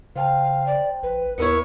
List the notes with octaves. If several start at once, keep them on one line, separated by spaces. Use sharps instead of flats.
C#3 C5 F5 G5 A5
D5
A#1 B4
D#2 B3 E4 A#4 C#5 C#7